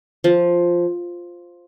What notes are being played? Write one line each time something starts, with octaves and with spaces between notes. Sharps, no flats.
F3